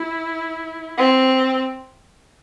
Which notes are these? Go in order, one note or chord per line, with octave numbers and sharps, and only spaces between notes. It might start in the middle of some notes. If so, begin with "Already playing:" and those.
Already playing: E4
C4